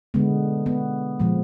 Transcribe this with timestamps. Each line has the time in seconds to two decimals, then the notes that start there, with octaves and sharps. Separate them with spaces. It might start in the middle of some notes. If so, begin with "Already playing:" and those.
0.14 D3 G#3 B3
0.66 B3
1.20 A#2 F3 G#3